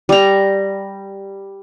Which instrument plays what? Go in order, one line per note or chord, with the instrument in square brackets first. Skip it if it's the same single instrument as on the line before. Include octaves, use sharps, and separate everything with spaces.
[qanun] G3 A#5